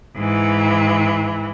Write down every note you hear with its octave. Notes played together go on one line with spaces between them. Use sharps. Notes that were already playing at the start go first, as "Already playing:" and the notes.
G#2 E3